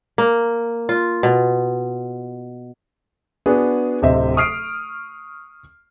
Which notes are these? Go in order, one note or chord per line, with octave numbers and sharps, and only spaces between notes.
A#3
F4
B2
B3 D4 F#4 G#4
D1 C3 C5 D#5 E5
C#6 D#6 F6 C7 D7